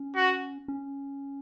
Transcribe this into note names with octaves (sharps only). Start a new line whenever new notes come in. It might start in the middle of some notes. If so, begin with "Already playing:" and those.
Already playing: C#4
F#4
C#4